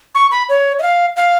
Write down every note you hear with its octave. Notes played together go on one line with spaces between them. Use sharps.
C#6
B5
C#5
D#5
F5
F5